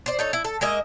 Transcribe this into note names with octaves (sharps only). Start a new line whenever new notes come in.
C5 D5
D#4 A4 C#5
E4
A4
G#3 A#3 D#5 E5